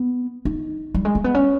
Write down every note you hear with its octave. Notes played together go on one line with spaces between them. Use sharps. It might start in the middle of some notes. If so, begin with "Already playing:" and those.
Already playing: B3
D#4
G3
G#3
A#3
B3
C#4